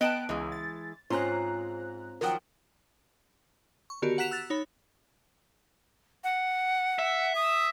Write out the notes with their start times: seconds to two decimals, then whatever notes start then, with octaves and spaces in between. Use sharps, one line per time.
0.01 B3 D#5 G5 A5 F#6 D7
0.29 C#2 E3 G#3
0.52 A6
1.10 G#2 C4 C#4 F4 C5 A#5 F#6
2.21 D#3 F3 F#3 A#4 F#5 G5
3.90 C#6
4.02 D3 D#3 B3 F#4 G4 A#4
4.18 F#5 A#5 F#6 B6 E7 F7
4.31 E6 F#6 A6
4.50 D#4 C#5 B5
6.24 F#5
6.99 E5
7.35 D#6